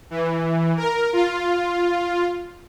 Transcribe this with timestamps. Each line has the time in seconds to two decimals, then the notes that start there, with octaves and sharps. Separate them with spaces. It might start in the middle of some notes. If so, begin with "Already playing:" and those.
0.10 E3
0.77 A#4
1.13 F4